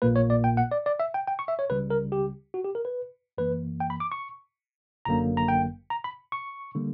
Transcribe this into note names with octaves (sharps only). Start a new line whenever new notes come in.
A#1 A#2 A#3 B4
C#5
D5
G5
F#5
D5
D5
E5
G5
G5
C#6
E5
C#5
C#2 C#3 G3 B4
A#4
G4
F#4
G4
A#4
B4
F#2 E3 A#3 B4
G5
B5
D6
C#6
G1 F#2 D3 F#3 A#3 A#5
A#5
G5
A#5
B5
C#6
D3 G3 A#3